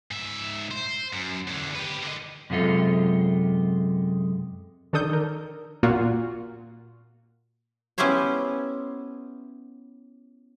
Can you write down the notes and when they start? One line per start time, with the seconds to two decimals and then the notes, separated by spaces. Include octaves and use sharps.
0.11 G#2 E5
0.71 C5
1.13 F#2
1.48 E2 D3
1.75 B3 G4
2.03 D3 D#5
2.50 F#2 C3 G#3 F4 A4
4.93 D#3 D4 A4 D#6 G6
5.13 A#4
5.83 A#2 A#3 F4 F#4
7.98 B3 C#4 E4 G4 C5 C#5